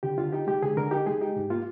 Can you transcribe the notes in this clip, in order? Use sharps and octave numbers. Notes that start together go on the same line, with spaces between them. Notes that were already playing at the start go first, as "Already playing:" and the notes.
D3 G4
D3 F4
D#4 G4
G#3 G4
D3 G#4
D3 A#4
D#4 G4
G#3 G#4
D#4 G4
G#2
A#3 F4